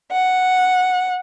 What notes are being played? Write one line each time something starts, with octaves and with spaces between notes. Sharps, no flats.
F#5